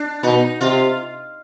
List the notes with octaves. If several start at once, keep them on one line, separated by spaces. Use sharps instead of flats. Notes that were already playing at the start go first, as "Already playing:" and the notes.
Already playing: D4
B2 D#4
C3 F4